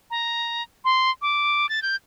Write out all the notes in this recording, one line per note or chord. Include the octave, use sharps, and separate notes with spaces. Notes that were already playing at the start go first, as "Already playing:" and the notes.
A#5
C6
D6
A6
G6